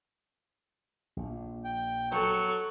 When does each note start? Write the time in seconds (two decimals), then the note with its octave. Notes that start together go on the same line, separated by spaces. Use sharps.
1.17 A#1
1.65 G5
2.12 F#3 A4 C#6